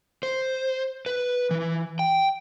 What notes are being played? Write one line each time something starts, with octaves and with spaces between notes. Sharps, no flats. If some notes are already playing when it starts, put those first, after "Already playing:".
C5
B4
E3
G5